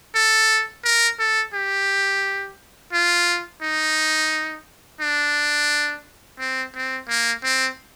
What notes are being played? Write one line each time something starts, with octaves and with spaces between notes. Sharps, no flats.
A4
A#4
A4
G4
F4
D#4
D4
C4
C4
A#3
C4